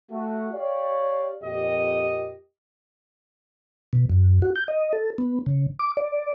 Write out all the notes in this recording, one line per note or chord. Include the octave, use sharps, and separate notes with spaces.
A3 F#4
G4 C#5 D5 F5
F2 A#2 G4 D#5
B2
F#2
F#4
G6
D#5
A4
B3
C#3
D6
D5